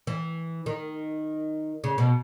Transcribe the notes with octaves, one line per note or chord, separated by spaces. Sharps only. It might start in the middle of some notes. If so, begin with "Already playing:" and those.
E3
D#3
C#3
B2